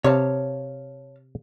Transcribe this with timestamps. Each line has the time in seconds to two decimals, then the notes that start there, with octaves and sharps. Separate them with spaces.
0.04 C3 C#5 F5 A5